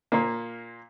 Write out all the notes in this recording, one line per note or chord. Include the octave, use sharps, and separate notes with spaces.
A#2 A#3